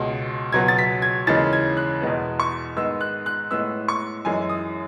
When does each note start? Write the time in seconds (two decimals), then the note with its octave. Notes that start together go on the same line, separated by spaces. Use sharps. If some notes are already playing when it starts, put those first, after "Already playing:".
Already playing: C#2 B2 G#3
0.53 C#2 B2 F#3 B3 G#6
0.68 A6
0.78 B6
1.02 G#6
1.27 D#2 C#3 E3 G#3 A6
1.53 G#6
1.77 F#6
2.02 E2 B2 G#3 B3
2.40 C#6
2.76 G#2 D#3 G#3 B3 E6
3.01 F#6
3.26 F#6
3.51 A2 G#3 B3 E6
3.88 C#6
4.25 F#2 E3 G#3 G#5
4.50 D#6